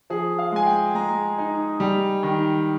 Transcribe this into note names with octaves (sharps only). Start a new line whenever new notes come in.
F3 G#4
F5
G#3 G#5
G5
G#3 A#5
D#4
G3
D#3